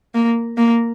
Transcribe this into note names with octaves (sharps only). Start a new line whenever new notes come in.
A#3
A#3